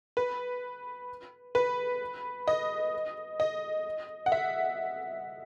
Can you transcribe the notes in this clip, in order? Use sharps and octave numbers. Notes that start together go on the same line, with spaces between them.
B4
B4
D#5
D#5
F#5
E5